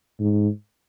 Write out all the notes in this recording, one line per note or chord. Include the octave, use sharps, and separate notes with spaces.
G#2